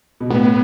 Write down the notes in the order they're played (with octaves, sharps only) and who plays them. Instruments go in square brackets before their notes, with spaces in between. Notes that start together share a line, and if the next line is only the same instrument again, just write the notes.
[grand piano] B2
[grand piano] A2 [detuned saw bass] B3